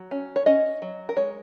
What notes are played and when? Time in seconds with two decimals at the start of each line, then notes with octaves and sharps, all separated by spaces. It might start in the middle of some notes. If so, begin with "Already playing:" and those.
Already playing: F#3
0.11 C#4
0.36 C#5
0.46 C#4 D#5
0.82 F#3
1.09 A#4
1.16 G#3 C#5